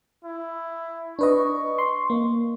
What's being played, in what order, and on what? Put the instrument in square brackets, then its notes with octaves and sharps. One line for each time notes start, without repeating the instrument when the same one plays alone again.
[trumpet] E4
[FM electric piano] D4 B4 D#5 [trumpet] C#6
[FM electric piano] C6
A#3